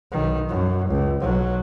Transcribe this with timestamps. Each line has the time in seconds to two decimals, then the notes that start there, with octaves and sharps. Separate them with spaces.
0.12 B1 D#3
0.49 F#2
0.89 C#2
1.20 B1 F#3